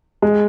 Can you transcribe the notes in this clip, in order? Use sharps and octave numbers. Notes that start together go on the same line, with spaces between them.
G#3